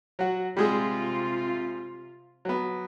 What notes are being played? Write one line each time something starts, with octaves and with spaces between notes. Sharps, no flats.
F#3 F#4
C3 G3 G#3 F4 G#4
F#3 B3